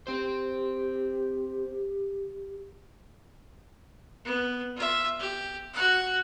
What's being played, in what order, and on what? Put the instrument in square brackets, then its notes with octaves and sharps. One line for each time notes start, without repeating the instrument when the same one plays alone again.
[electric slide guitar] C4 C5 [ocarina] G4
[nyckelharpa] B3
F4 E5
G4
F#4 F#5